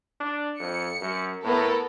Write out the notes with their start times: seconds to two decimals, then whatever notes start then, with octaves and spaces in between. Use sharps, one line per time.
0.21 D4
0.60 F2 C#7
1.01 F#2
1.44 A2 B3 A4 A#4